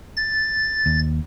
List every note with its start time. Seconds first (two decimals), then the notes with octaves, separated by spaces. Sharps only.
0.17 A6
0.86 D#2